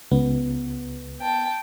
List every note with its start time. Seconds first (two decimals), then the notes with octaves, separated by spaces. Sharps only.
0.11 C#2 B3
1.21 G5 A5